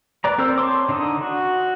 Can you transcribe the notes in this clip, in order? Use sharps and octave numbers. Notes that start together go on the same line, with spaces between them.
B4 D5 A#5
C4 A4 A#4 C5 E6
C#5 A5 C6 D6
D3 D#4 A5 D#6
F#4